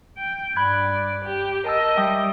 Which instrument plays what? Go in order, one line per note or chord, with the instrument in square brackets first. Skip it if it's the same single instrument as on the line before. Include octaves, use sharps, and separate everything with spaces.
[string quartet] G5
[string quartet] G2 D5 [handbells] B5 F#6 G#6
[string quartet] G4
[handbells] A#4 A5 E6 [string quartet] D#5
[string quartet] G3 [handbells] E5 G5 D#6